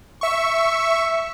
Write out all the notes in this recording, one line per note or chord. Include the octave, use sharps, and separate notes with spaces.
E5 C#6